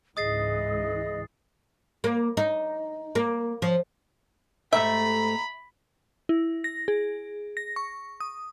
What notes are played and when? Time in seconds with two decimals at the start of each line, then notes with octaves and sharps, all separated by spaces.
0.17 C#2 G#2 E3 G#4 D#5 D#6 A6 C7
2.04 A#3
2.37 D#4
3.15 A#3
3.62 F3
4.73 G#2 A3 G4 E5 A#5 B5
6.29 E4
6.64 A#6
6.88 G#4
7.57 A#6
7.76 C#6
8.20 D#6